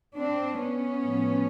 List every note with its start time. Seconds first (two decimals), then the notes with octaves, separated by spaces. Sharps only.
0.16 C4 D4
0.60 B3 C#4
1.04 A2 F3